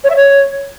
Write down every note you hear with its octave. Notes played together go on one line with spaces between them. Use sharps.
C#5
E5
C#5